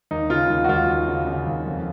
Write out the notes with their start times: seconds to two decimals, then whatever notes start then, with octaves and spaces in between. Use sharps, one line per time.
0.11 D#2 D#4
0.30 C#3 F4
0.50 D#2
0.64 F#4
0.69 D#2 F4
0.88 D#2
1.08 C#3
1.27 C#3
1.47 D#2
1.66 F2